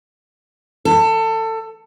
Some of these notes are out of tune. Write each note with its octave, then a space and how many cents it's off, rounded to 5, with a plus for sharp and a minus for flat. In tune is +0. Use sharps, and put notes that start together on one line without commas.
A4 +25